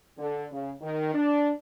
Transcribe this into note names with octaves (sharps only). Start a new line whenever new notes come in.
D3
C#3
D#3
D4